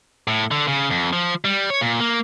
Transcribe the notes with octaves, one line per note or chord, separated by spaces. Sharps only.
A2
D3
C#3
F2
F3
G3
C#5
A#2
A#3